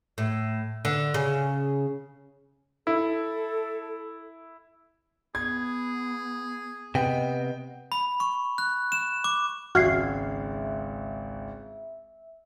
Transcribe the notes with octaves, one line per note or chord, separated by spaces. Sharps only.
A2
D3
C#3
E4 A4
B3 G#4 G#6
C3 B3 D#5 G5
B5
C#6
F#6
E7
D6
G#1 C#2 F#4 E5 F6 G#6 C7